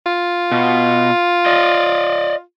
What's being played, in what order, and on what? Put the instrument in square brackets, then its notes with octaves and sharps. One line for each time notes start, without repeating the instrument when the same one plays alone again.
[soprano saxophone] F4
[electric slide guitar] B2
D5 D#5